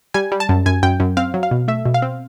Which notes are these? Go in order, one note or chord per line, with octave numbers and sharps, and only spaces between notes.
G3 G#5
G3
A5
F#2
F#2 G#5
F#2 G5
F#2
C4 F5
F#3
F5
B2
A3 E5
B2
F5
C4